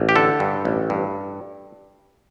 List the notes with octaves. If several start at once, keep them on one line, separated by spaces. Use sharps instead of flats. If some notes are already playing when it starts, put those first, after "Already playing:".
Already playing: A1
G4
D3 A4
G2
A1
G2